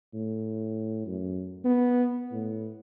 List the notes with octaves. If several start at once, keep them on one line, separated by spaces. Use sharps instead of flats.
A2
F#2
B3
A2